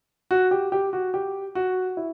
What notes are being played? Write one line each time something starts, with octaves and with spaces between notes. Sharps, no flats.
F#4
G4
G4
F#4
G4
F#4
E4